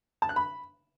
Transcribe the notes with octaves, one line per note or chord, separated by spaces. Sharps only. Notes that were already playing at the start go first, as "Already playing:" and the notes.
A5
F#6
B5